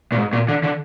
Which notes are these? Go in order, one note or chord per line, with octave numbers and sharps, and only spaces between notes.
A#2
G#2
A#2
D3
D3